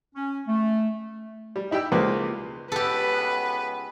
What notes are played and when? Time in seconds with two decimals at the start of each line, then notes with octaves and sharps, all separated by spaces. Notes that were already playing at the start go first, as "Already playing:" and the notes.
0.15 C#4
0.48 A3
1.56 G3
1.71 D#4 E4 G4 G5 E6
1.92 C#2 G#3 A#3 B4 C5 D5
2.72 C#2 B3 G4 A4 B4